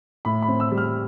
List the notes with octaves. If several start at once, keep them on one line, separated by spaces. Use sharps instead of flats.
A2 B5
B5
C4
E6
G3
F6